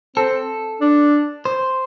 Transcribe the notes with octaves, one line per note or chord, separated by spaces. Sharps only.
C4 A4
D4
C5